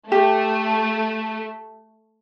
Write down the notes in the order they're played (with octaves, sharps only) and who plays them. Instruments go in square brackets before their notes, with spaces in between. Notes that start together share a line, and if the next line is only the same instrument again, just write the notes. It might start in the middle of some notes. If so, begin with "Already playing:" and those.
[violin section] A3 [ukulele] G4